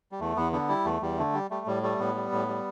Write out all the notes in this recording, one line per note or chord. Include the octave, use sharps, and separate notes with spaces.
G3
E2 A3
E2 B3
D3 B3
G3 E4
E2 A3
E2 G3
D3 A3
G3
G3 A3
A2 G3
G3 A3
A2 B3
G3
A2
G3